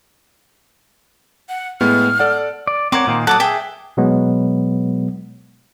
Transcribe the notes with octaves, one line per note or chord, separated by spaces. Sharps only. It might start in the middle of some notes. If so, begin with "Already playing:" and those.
F#5
A2 G#3 B3 F6
A4 D5 F#5
D5
C4 A#4 C5 C#5 F#5 D6
A#2 D#3 A#3
F#3 A4 F#5 D6 D#6
G#4 E5 G5 D#6
B2 F#3 G#3 B3